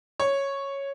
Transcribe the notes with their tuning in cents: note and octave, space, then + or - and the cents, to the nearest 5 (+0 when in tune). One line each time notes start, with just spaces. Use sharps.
C#5 -5